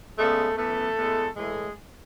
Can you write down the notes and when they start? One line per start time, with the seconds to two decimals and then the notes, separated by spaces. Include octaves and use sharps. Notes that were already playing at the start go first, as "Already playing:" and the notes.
0.18 C#3 G#3 A3 B3 A4
0.57 F#2 E3 A3 B3 A4
0.97 A2 G#3 B3
1.36 A2 E3 G#3 A3 G#4